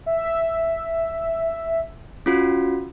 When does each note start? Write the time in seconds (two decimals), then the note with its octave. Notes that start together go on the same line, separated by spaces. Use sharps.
0.06 E5
2.26 C#4 F4 F#4